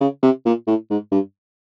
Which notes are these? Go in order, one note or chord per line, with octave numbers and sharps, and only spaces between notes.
C#3
C3
A#2
A2
G#2
G2